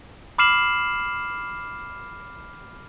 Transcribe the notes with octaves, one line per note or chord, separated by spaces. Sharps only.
B5 D6 F6 C7 E7 F#7